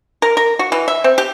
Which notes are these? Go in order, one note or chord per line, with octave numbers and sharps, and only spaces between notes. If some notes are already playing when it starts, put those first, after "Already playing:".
A#4
A#4
F#4
E3
E5
C4
G4